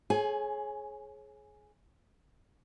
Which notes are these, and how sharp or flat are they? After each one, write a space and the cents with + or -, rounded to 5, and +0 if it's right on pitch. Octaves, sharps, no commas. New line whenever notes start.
G#4 +25 C#5 -25 G#5 +0